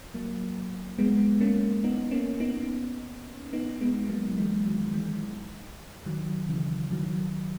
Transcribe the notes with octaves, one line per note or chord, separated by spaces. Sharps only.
F#3 A#3
G#3 B3
A#3 C#4
B3 D#4
A#3 C#4
B3 D#4
B3 D#4
G#3 B3
F#3 A#3
E3 G#3
D#3 F#3
E3 G#3
D#3 F#3
C#3 E3
D#3 F#3